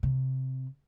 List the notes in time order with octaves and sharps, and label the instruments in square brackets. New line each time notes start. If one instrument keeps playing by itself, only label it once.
[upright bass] C3